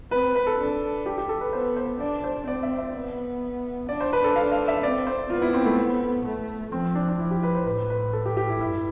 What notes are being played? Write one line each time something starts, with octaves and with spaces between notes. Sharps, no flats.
C4 B4
B4
A4
D4
G4
G4
A4
B4
B3 C5
C5
D4 D5
C5
C4 D5
E5
E5
B3
D4 D5
C5
B4
A4
F5
F5
E5
C4 D5
C5
B3 F4
E4
C4
A3
A3
F3 C4
D4
D4
F3 E4
G4
B4
C5
A2 B4
B4
A4
G4
G4
E4
G2 E4